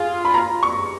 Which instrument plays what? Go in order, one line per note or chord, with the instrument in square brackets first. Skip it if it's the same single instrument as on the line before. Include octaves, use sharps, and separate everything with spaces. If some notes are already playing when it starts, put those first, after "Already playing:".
Already playing: [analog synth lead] F4 [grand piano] G#4
[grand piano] B5
A#5
C#6